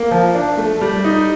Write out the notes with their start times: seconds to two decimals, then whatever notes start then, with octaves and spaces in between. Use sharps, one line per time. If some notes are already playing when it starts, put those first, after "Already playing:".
Already playing: A#3
0.11 F3
0.35 D4
0.57 A3
0.81 G3
1.04 D#4